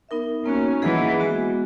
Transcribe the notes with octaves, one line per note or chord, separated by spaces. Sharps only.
B3 D#4 A#4 E5
A#3 C#4 D#4 F#4
E3 A#3 E4 G#4 D#5 F#5
G#3 B3 F#4